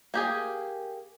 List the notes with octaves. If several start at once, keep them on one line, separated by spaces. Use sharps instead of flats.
A#3 G4 G#4